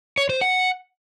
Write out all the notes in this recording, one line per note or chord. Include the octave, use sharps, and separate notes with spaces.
C#5
C5
F#5